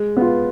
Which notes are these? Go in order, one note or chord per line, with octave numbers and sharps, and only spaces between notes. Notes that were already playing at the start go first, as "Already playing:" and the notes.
Already playing: G#3
B3 F4